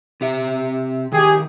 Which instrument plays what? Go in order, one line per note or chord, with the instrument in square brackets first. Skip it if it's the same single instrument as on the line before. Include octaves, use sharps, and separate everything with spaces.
[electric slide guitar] C3 G4 E5
[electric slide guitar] F2 D#3 [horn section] G4 G#4